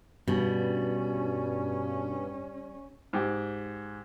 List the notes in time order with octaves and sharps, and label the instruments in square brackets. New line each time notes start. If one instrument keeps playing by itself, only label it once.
[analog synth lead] G2 [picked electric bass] B2 [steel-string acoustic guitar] G3 [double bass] C#4
[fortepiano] G#2 G4